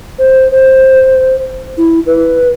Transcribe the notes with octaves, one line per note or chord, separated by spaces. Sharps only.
C5
C5
E4
B4